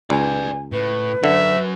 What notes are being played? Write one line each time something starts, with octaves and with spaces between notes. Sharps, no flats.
C#2 B4 D5 G#5
A2 B4
F#2 D3 F#4 E5